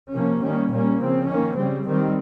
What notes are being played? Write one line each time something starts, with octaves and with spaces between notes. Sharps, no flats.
C3 F3 A#3 C#4
D#3 G3 A#3 C#4
A#2 G3 A#3 C#4
C#3 F3 C4
D#3 A#3 C#4
C#3 G3 C4
D#3 G3 C4